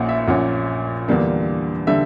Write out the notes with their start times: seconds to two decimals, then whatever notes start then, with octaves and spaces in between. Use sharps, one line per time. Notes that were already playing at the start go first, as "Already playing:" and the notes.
Already playing: A#1 A#2 A#3 C#4 F#5
0.09 E5
0.28 A#1 A#2 A#3 C#4 F#5
1.08 E2 D3 G3 A#3 D4
1.87 D3 G3 E5